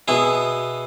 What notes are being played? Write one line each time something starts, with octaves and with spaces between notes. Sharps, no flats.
B2 B3 E4 G#4